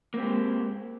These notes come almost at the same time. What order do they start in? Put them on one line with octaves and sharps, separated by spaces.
A#3 C4 G4 G#3